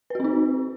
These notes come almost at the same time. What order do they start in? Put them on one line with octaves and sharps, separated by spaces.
B4 F#4 C4 D#4